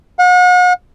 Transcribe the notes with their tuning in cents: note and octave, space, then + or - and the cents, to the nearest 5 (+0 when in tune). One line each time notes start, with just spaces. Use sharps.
F#5 -40